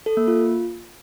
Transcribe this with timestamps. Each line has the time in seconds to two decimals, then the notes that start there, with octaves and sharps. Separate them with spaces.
0.06 A4
0.17 A#3
0.28 F4